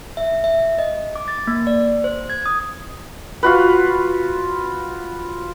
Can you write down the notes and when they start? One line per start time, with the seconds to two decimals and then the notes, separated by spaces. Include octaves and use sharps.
0.17 E5
0.44 E5
0.78 D#5
1.16 D6
1.28 A6
1.47 A#3
1.67 D5
2.04 C5
2.30 G#6
2.46 D#6
3.43 F4 F#4 B4